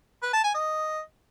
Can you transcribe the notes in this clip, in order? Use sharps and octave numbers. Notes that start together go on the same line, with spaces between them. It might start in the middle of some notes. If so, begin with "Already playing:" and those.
B4
A5
G#5
D#5